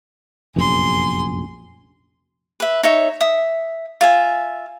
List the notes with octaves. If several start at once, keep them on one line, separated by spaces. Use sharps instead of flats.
F1 A#1 F#2 G#4 C6
B4 E5
D#4 C#5 E5
E5 D#6
F4 E5 G#5